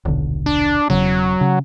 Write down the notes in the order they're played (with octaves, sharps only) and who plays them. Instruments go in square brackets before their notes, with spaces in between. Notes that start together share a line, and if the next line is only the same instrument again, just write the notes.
[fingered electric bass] D#1 B1 D3
[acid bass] D4
[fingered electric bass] E1 C#3 [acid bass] F#3
[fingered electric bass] C#3